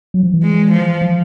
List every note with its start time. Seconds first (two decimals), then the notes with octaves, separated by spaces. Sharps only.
0.14 F#3
0.23 F3
0.34 E3
0.43 G#3
0.71 F3
1.02 F3